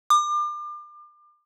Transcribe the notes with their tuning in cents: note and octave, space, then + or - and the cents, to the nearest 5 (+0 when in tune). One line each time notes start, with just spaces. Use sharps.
D6 +35